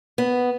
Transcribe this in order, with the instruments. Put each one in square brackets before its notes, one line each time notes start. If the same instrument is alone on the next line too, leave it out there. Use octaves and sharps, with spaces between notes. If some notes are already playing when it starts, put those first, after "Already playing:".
[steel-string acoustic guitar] B3